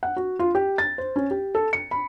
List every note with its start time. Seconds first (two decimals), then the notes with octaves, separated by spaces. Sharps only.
0.03 F#5
0.17 F#4
0.39 F4
0.55 G4
0.78 A6
0.98 C5
1.16 C#4
1.31 G4
1.55 A4
1.73 C#7
1.91 B5